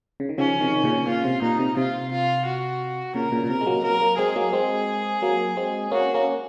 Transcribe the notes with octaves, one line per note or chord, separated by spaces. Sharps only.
C#3
D#3
C#3 F3 C#4
C3 D#3
A#2 C#3
A#2 F4
C3
A#2 D#4
C3
C3 F4
F4
F#4
A#2 C#3 A#4
A#2 C#3
A#2
C3 A#4
G#3
F#3 A#3
F#3 A#3 A#4
F#3 A#3
G#3 C4 G#4
F#3 A#3
G#3 C4
F#3 A#3
G#3 C4
A#3 C#4 F#4
A#3 C#4